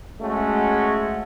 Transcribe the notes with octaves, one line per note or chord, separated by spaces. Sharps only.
G#3 A3 C#4 F#4